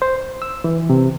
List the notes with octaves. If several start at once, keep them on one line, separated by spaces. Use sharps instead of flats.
C5
E6
E3
C3